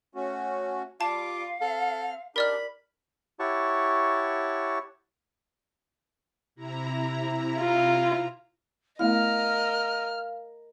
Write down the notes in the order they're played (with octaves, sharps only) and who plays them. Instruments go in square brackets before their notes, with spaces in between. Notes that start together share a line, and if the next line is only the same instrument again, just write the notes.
[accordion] A3 C#4 F#4
[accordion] G3 D6 [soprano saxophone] F4 [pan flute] F5 [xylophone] A5
[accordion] C4 F6 [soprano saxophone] A4
[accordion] D4 D#4 G4 [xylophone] A#4 D5 F6 [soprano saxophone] B5
[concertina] E4 G4 C#5 F#5 A5 C#6
[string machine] C3 E4 A#5
[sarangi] F4
[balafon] A3 B3 E4 [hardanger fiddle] A#4 D#5 [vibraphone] F5 [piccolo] F6